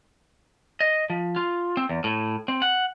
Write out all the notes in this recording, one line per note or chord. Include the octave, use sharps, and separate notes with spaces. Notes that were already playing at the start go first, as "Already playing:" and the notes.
D#5
F3
F4
C4
E2
A2
C4
F#5